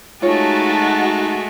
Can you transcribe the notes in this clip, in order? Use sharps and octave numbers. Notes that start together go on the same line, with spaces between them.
G#3 A3 D#4 F4 F#4 C#5 A5